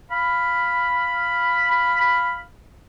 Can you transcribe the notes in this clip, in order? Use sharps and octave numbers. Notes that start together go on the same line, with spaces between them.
F5 B5